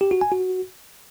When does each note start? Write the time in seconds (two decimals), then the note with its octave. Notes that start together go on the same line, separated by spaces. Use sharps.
0.01 G4
0.11 F#4
0.21 G#5
0.32 F#4